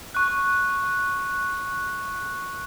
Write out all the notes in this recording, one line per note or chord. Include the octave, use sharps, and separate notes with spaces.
C#6 F#6